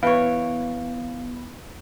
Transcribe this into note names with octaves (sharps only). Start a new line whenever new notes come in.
E3 B3 C#5 F5